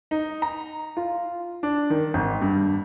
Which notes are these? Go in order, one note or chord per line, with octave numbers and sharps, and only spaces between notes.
D#4
A#5
F4
D4
D#3
G#1
G2